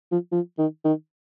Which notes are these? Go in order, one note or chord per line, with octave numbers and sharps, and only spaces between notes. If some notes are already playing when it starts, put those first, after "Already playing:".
F3
F3
D#3
D#3